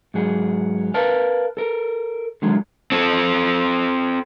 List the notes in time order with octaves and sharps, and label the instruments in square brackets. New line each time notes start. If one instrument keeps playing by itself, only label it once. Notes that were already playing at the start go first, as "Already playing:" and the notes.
[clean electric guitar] G#2 F#3 G#4
A#4 B4 F5 A5
A4 A#4
D3 D#3 F#3 G#3
[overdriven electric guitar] C4 A4